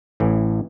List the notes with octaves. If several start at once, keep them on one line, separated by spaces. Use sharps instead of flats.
A1 A2 E3